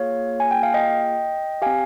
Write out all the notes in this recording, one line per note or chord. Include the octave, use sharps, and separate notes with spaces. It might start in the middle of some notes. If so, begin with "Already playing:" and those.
Already playing: A#3 F4 G#4 C#5 F5
G#5
G5
F5
D#5 G5
C4 G4 F5 G#5